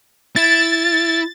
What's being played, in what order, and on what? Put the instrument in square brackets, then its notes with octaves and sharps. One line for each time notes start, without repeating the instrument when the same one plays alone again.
[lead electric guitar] E4 [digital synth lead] A6